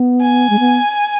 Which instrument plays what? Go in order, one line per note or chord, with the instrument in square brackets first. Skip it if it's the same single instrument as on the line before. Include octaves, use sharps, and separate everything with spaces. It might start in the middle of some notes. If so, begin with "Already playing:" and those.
Already playing: [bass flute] B3
[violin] G#5
[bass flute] G#3
B3